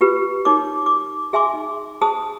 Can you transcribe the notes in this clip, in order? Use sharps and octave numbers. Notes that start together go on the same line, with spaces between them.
F4 G4 B4
D#4 A#4 C#5 D6
D6
G#4 E5 G#5 C6 D6
D#4
G#4 C5 A5 D#6